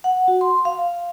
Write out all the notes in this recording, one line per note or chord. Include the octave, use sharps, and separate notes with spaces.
F#5
F#4
C6
F5